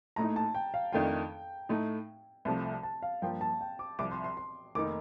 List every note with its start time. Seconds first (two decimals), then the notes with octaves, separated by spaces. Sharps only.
0.16 A#1 A2 A3 D#4 A#5
0.36 A5
0.55 G5
0.74 F5
0.92 F2 D#3 A3 D4 F4 G5
1.69 A2 A3 D#4
2.45 C2 C3 F3 A3 A5
2.64 A5
2.83 A5
3.02 F5
3.22 G2 F3 A#3 F4 G5
3.41 A5
3.61 G5
3.79 D6
3.99 C2 C3 F3 D6
4.11 C6
4.24 C6
4.37 C6
4.75 F1 D#3 A#3 D#4 D6